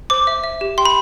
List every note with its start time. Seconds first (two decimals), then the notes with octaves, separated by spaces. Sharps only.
0.10 C5 D6
0.27 E5
0.44 E5
0.61 G4
0.78 G5 C6
0.85 B5